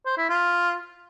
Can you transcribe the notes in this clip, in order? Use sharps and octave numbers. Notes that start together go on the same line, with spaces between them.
C5
E4
F4